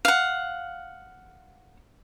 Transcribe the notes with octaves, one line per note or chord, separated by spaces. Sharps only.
F5 F#5